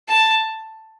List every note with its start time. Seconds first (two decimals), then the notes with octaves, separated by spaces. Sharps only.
0.09 A5